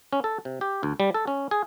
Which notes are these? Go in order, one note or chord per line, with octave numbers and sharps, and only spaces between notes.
C#4
A4
C3
G4
D2
G3
A4
C#4
G#4